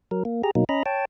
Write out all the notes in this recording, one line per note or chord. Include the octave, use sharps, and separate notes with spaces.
F#3 A#4
A#3
G4 G#4 A#5
B2 F#3 A#3 D#4
C#4 D#5 A#5 B5
C#5 G5 A5